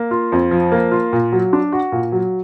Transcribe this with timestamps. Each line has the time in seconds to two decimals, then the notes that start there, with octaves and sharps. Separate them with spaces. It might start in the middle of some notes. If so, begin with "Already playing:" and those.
Already playing: A#3
0.11 F4
0.32 F2
0.51 F3
0.72 A#3
0.91 F4
1.13 A#2
1.32 F#3
1.53 D4
1.72 F#4
1.92 A#2
2.12 F#3